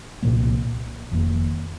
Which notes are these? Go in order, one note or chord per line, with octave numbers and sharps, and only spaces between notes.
C2 A#2 F3 A#3
F1 F2 D#3 A#3